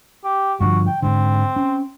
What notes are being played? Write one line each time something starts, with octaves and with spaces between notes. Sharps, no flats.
G4
G2 D3 F3 F#4
G5
G#2 D3 C4
C#4